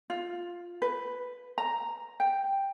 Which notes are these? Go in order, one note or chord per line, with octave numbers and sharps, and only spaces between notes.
F4
B4
A#5
G5